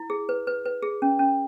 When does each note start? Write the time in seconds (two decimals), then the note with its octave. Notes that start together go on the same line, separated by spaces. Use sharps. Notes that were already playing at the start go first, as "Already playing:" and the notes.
Already playing: E4
0.10 G#4
0.29 B4
0.47 B4
0.65 B4
0.83 G#4
1.02 C#4
1.19 C#4